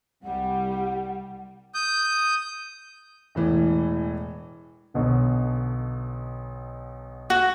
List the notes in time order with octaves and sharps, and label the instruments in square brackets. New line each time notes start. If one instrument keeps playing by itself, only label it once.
[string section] C2 G3 [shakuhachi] F#5
[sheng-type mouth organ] D#6 G6
[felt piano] E1 A2 E3
[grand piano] B1 B2 D3
[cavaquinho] F#4